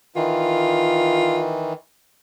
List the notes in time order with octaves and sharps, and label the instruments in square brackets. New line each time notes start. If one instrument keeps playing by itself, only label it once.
[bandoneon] D#3 E3 [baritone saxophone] F4